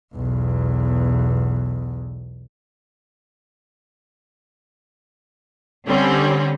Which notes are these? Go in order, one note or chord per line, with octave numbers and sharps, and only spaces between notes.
B1 E2
D3 G3 C4 C#4